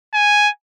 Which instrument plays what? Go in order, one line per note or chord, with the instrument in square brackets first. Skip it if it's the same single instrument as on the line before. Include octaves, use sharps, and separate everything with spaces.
[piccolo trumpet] G#5